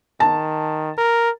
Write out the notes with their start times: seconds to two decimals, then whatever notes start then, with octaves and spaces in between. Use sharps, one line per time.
0.20 D#3 A5
0.98 A#4